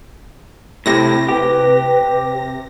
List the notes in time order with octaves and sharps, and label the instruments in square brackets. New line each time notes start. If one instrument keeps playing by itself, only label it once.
[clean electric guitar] A2 [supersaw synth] C3 A#6
[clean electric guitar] G4 [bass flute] B4